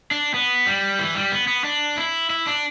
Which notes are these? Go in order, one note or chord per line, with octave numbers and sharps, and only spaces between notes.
D4
B3
G3
E3
G3
B3
B3
D4
E4
E4
D4